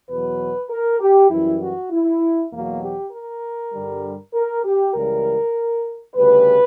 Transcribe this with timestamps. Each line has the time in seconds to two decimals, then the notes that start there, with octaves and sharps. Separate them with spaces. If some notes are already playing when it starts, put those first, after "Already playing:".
0.09 E2 B2 F#3 B4
0.70 A#4
1.00 G4
1.30 F#2 E3 G3 E4
1.60 F#4
1.91 E4
2.52 E2 B2 F#3 A#3
2.81 G4
3.12 A#4
3.72 G2 D3 G3
4.34 A#4
4.64 G4
4.94 C#2 C#3 E3 G3 A#4
6.16 D2 C#3 G3 B4